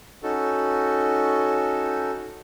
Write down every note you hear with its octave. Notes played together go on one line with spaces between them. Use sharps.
C#4 D#4 F#4 A4